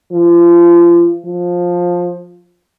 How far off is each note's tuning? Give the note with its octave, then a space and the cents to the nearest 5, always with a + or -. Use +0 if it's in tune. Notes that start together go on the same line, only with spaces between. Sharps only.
F3 -30
F3 +15